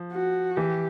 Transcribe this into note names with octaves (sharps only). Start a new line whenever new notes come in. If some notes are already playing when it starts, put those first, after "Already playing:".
Already playing: F3
F#4
E3 G4